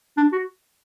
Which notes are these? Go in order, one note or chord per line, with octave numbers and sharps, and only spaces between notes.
D4
F#4